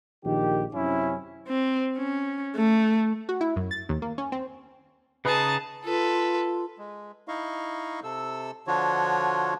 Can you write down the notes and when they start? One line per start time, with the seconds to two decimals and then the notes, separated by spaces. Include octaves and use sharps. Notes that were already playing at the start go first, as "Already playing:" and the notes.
0.25 A#1 D#3 G4
0.74 F#2 C3 C#4 E4
1.48 C4
1.98 C#4
2.56 A3
3.29 F#4
3.41 E4
3.56 F#2
3.71 A6
3.89 D#2
4.02 A#3
4.18 C#4
4.32 C4
5.25 C#3 D#4 G#4 B4 D#5 A5
5.85 F4 A4 B4
6.78 G#3
7.28 D#4 E4 D#5 F5 C#6
8.04 C3 A4 E6
8.67 D3 F3 D4 F4 F#4 C#5